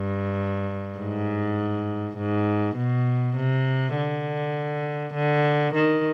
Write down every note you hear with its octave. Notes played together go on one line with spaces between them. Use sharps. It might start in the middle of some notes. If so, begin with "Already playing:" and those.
Already playing: G2
G#2
G#2
B2
C3
D3
D3
D#3